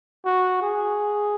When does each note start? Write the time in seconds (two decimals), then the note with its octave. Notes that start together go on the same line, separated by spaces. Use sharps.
0.25 F#4
0.62 G#4